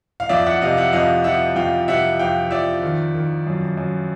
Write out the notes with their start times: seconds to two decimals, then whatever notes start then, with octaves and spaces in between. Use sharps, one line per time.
0.20 F5
0.29 F2 D5 E5
0.46 E5 F#5
0.62 C3 D#5 F5
0.77 E5 F#5
0.92 F2 D#5 F5
1.24 F3 E5 F#5
1.56 F2 F5 G5
1.88 C3 E5 F#5
2.19 F2 F5 G5
2.51 F3 D5 E5
2.83 D#3
3.15 D#3
3.46 F#2
3.77 F#2